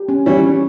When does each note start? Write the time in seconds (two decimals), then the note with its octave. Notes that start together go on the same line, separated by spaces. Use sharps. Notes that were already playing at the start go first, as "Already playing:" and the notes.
Already playing: G4
0.09 C#4
0.26 E3 G3 C#5
0.44 C#4